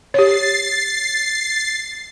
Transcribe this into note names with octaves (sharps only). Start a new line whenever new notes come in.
G4 C#5 A6 C7